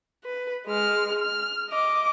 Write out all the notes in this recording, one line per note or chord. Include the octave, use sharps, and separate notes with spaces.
B4
G#3 F6
F6
D#5 D6